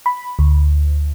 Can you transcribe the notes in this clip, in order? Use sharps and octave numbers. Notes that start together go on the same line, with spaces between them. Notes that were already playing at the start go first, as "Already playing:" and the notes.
B5
D2